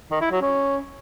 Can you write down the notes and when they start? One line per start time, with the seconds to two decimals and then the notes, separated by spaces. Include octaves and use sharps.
0.11 D#3
0.21 E4
0.31 F#3
0.42 C#4